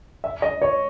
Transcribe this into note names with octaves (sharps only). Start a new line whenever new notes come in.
E5
D#5
C#5